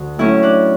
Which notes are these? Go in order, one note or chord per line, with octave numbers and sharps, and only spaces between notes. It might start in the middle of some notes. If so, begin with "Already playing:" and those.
Already playing: D2 D3
A2 F#3 A3 C#4 E4
D4